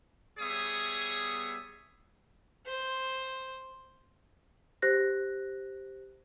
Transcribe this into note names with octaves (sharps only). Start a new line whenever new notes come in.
G3 B3 G#4 C#5 E5 D#6
C5
G4 C5 F#6 A#6